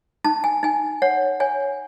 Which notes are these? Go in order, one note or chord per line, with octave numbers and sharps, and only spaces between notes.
D#4 A5
G#5
D#4 G#5
C#5 F#5
C#5 G#5